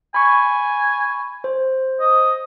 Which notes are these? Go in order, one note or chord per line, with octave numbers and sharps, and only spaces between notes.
G#5 B5 C#6
C5
D#5